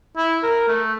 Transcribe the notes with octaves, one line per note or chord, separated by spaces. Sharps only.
E4
A#4
A3